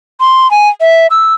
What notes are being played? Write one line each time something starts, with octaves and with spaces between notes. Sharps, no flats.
C6
G#5
E5
E6